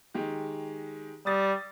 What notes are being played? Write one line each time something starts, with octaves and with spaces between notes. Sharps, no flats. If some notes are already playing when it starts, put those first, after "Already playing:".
D#3 G#3 G4
G3 D#6 A6